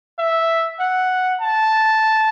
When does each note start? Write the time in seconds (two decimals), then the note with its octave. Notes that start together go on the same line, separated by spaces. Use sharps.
0.19 E5
0.79 F#5
1.41 A5